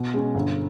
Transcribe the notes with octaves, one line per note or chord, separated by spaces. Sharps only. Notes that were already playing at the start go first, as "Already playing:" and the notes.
Already playing: B2
G#3 C#4
G1